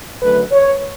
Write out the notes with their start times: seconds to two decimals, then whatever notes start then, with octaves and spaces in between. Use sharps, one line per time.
0.22 F#2 D3 F#3 A3 B4
0.51 C#5